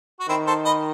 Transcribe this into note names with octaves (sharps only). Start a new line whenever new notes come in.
F#4
D#3 C4 E4
A4 C5
B4 D#5